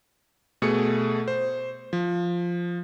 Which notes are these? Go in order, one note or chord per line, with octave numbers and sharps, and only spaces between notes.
B2 A3 G#4 C#7
C5
F3